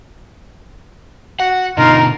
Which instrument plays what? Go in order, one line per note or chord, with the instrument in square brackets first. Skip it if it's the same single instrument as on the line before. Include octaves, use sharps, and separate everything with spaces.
[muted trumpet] F#4 [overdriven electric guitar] F#5
[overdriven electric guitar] B2 D3 [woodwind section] D#4 F4 [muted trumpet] A#4 [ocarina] A#5